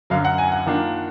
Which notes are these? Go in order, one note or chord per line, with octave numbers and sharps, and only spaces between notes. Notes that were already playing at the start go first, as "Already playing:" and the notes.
F#2 D3 F#3 F5
F#5
G#5
F#5
D#3 A#3 D4 F4